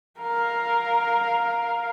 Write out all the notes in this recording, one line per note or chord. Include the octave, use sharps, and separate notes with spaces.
A#4 F5